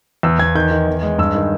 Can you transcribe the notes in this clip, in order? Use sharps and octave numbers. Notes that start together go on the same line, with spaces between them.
E2 E6
E2 G#6
D#3 G6
D#3
E2
G#3
G2 E6
D#3